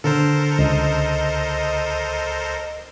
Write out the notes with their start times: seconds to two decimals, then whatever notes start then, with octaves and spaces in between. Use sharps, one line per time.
0.04 D3 A4 A#4 C5
0.59 C#2 D#5